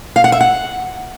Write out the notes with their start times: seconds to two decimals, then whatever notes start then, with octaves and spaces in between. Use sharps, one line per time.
0.16 F5
0.24 F#5
0.32 E5
0.41 F#5